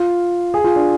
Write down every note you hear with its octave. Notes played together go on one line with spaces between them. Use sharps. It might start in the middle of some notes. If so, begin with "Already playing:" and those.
Already playing: F4
G#4
F4
D4